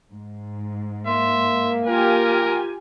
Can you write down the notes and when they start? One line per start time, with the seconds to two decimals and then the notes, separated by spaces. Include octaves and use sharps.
0.13 G#2
1.07 A#3 E5 C6
1.87 F4 G4 A#4 G#5